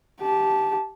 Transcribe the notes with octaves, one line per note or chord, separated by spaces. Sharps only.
G4 A5